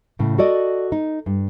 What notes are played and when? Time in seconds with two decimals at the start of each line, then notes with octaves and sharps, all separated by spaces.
0.19 A2 C#3
0.38 F#4 A4 D5 D#5
0.92 D#4
1.26 G2